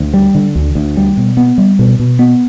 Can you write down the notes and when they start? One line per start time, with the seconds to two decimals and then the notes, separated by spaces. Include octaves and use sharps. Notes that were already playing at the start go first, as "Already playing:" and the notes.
Already playing: D2
0.14 G3
0.35 D3
0.55 D2
0.75 D2
0.97 G3
1.17 B2
1.37 B3
1.58 G3
1.79 B2
1.99 B2
2.19 B3